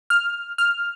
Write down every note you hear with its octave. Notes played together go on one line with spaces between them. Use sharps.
F6
F6